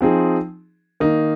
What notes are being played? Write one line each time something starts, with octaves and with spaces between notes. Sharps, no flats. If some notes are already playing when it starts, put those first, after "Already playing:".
F3 C4 D#4 G#4
D#3 A#3 D#4